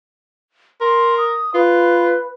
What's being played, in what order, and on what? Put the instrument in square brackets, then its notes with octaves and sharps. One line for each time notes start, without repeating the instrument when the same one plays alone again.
[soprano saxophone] A#4 [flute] C6
[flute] D#6
[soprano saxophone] F4 [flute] B4